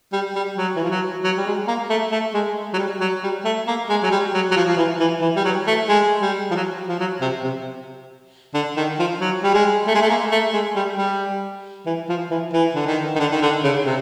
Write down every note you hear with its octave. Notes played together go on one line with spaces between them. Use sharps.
G3
G3
F#3
E3
F3
F#3
F#3
G3
G#3
A#3
A3
A3
G#3
F#3
G3
F#3
G3
A3
A#3
G#3
F#3
G3
F#3
F#3
F3
F3
E3
E3
E3
G3
F#3
A3
G#3
G3
F3
F#3
F3
F#3
C3
C3
D3
D#3
F3
F#3
G3
G#3
A3
G#3
A3
A#3
A3
G#3
G3
G3
E3
F3
E3
E3
D3
D#3
D#3
D3
D#3
D3
C#3
C3